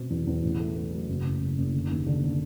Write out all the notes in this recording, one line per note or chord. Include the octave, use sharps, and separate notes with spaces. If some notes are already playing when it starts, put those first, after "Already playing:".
Already playing: B2 C4
E2
E2
A1
A3
A3
F#3
F#1
F#1
F#1
F#1
D3
D#2
D3
D3